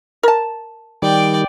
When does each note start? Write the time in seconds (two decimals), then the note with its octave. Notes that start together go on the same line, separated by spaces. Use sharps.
0.23 A#4 A5
1.02 D#3 G3 D5 G5